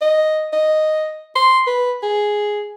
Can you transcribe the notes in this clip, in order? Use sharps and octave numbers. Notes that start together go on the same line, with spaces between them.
D#5
D#5
C6
B4
G#4